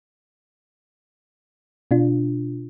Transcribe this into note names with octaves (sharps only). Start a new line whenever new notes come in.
B2 D4 F4